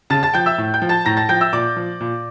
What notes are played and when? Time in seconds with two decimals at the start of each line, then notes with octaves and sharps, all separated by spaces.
0.10 C#3 A5 A6
0.23 A5 A6
0.34 F3 G5 G6
0.46 E5 E6
0.58 A2
0.74 G5 G6
0.82 F3
0.89 A5 A6
1.05 A2 A#5 A#6
1.17 A5 A6
1.29 F3 G5 G6
1.41 E5 E6
1.53 A#2 D5 D6
1.76 F3
2.00 A#2